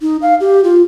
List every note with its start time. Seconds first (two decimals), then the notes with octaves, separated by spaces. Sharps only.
0.01 D#4
0.22 F5
0.40 G4
0.64 F4